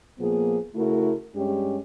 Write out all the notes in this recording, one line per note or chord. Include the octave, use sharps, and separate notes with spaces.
A#2 F3 A#3 B3 G#4
C#3 A3 E4 F#4 A#4
G2 G#3 C#4 G4